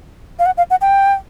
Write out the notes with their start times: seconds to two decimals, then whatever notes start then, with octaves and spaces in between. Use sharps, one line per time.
0.39 F5
0.46 F#5
0.58 F5
0.70 F#5
0.81 G5